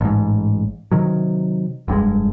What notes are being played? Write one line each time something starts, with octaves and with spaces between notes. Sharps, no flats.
A1 G#2
C3 D#3 F#3
F1 G2 B2 G#3